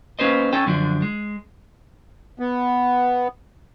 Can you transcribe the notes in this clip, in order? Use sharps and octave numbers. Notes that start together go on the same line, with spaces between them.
A#3 C#4 B4 C5 D#5
C#4 A4 G5
F#2 D3 F3 D4
G#3
B3